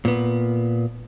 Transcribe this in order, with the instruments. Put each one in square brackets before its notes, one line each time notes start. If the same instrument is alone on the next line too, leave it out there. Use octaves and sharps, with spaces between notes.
[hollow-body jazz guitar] A#2 B3